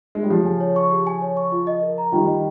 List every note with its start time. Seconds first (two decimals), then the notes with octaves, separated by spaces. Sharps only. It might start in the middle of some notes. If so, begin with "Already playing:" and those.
0.15 G#3
0.23 G3
0.30 C#3 F3 G4
0.46 G#5
0.61 C#5
0.76 C#6
0.91 G4
1.07 G#5
1.22 C#5
1.37 C#6
1.52 F4
1.67 D#5
1.82 A#4
1.98 A#5
2.12 D#3 G3 F4
2.27 D#5